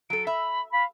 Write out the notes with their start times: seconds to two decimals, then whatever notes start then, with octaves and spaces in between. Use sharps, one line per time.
0.10 F#3 A4 D7
0.27 E5 B5
0.73 F5 B5